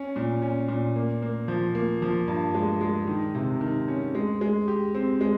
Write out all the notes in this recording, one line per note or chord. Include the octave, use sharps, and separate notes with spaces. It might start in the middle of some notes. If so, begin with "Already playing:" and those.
Already playing: C#4
A#2
C#4
A#2
A#3
A#3
F3
A#3
F3
G2
G#3
G#3
D#3
C3
D#3
C#4
G#3
G#3
G4
C4
G#3